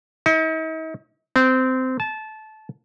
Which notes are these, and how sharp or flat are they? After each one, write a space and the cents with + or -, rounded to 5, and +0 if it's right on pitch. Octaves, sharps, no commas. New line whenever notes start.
D#4 +45
C4 -20
A5 -20